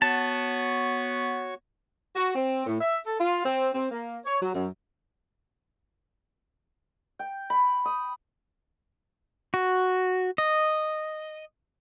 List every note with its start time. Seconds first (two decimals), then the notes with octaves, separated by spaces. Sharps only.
0.02 B3 F#4 C#5 A5 C#6
2.16 F#4
2.35 C4
2.67 A2
2.81 E5
3.05 A4
3.19 F4
3.45 C4
3.74 C4
3.91 A#3
4.25 C#5
4.42 F#3
4.54 F#2
7.19 G5
7.50 B5
7.85 D#6
9.54 F#4
10.38 D#5